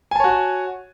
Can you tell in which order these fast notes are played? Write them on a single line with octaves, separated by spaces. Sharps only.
G#5 A5 C#5 F#4